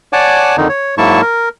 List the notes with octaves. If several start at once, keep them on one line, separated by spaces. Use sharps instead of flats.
C#5 D5 F#5 G#5 A5 D6
F2 D3 D#3 D#4
C#5
G#2 F#3 A#3 E4 A5 C#6
A#4